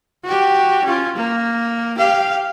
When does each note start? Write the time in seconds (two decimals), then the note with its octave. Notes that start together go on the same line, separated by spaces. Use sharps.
0.24 F#4 G4
0.84 C#4 F4
1.16 A#3
1.98 G4 F5